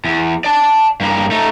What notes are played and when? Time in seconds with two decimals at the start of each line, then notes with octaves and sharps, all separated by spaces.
0.04 E2
0.44 D5 A5
1.00 G2 A#3
1.31 A3 D#4